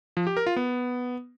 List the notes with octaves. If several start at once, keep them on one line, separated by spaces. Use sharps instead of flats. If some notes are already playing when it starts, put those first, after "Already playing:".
F3
G4
A#4
F4
B3